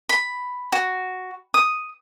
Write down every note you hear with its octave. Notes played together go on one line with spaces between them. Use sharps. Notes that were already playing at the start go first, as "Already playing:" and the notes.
B5
F#4
D#6